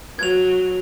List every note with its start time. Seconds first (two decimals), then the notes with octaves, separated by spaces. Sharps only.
0.19 F#3 G#6 F7